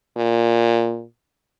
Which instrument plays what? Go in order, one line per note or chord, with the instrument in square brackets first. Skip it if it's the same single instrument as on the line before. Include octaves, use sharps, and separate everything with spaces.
[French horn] A#2